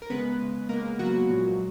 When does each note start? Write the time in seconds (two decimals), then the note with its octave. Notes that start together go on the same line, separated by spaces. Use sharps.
0.02 A#4
0.10 C#3 G#3 B3 B4
0.40 C#3 G#3
0.69 C#3 G#3 A#3 A#4
0.99 C#3 F#3 G#3 F#4
1.29 A#2 F3 G#3